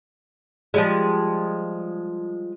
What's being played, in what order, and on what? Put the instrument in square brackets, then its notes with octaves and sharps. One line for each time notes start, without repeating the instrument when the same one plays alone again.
[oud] F3 G3 G#3